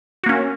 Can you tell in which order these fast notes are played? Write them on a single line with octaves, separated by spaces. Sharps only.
F#4 A#3 C#4